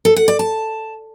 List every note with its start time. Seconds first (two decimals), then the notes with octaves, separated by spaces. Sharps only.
0.05 A4
0.16 F#5
0.28 D5
0.39 A5